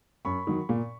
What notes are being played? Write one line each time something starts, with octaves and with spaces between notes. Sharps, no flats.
F#2 B5 C#6
D#3 F#3
A#2